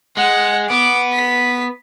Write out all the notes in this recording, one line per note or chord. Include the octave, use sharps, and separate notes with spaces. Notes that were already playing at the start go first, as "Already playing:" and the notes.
G#3 F#5
B3 D6
B6